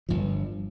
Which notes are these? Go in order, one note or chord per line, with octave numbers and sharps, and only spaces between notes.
G1 G2 F3